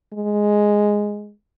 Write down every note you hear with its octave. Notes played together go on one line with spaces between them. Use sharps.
G#3